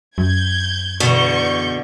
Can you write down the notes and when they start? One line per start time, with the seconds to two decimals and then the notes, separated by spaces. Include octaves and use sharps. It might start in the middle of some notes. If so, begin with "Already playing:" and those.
0.18 F#2 G6 G#6
1.00 E2 B2 D3 C#6 G6